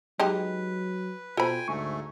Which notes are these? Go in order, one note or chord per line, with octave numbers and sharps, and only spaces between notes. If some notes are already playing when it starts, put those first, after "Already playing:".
F#3 G#3 D#4 G4 B4
B2 F4 A4 C5 G5 G#5 B5
D2 G#2 A3 G#5 C#6